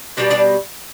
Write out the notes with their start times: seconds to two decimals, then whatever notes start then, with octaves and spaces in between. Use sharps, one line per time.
0.17 B2 G3 B3 D4 D5
0.30 D4 D5